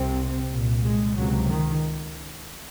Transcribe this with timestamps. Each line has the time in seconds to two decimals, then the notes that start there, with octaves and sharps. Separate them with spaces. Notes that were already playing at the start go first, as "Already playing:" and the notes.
Already playing: C2 C3 C4
0.50 C2 A#2
0.83 G#3
1.16 C#2 C3 F#3
1.49 D#3